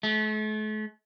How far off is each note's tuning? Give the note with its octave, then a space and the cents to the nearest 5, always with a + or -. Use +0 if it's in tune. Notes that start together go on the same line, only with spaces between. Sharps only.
A3 -40